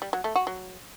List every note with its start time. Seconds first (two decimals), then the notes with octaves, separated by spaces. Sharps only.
0.02 G3
0.13 F#3
0.24 A3
0.36 F#4
0.47 F#3